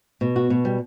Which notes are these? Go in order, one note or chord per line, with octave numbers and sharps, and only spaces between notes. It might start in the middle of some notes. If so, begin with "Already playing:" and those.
B2
F#4
B2
G3